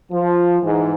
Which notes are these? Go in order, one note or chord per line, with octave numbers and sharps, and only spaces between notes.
F3
G#2 E3